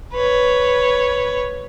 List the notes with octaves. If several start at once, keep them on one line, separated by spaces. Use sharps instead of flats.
B4 C#5